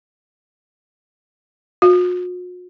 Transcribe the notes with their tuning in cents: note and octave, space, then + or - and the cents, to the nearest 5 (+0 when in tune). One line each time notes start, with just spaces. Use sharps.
F#4 -45